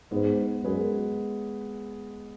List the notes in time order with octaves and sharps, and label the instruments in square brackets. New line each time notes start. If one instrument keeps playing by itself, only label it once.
[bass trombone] G#2 [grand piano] G#3 B3 G#4 B4
[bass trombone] F#2 [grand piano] G#3 B3 G#4 B4